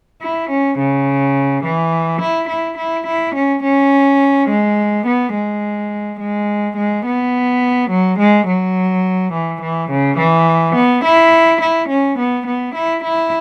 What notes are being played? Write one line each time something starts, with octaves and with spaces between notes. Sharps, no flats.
E4
C#4
C#3
E3
E4
E4
E4
E4
C#4
C#4
G#3
B3
G#3
G#3
G#3
B3
F#3
G#3
F#3
E3
E3
C#3
E3
B3
E4
E4
C#4
B3
B3
E4
E4